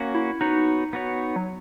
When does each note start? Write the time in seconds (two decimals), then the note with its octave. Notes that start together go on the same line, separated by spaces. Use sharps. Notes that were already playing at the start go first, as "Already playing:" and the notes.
Already playing: A#3 C#4 F#4
0.15 E4
0.41 B3 D#4 F#4 C#5
0.93 B3 F#4 C#5
1.36 F#3